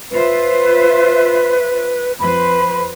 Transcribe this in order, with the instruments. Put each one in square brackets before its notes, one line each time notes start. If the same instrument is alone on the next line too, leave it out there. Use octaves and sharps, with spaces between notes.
[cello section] F4 C5 E5 [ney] B4
[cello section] F2 B4 C5 [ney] B5